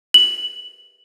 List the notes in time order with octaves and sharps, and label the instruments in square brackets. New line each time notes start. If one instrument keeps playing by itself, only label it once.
[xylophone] F#7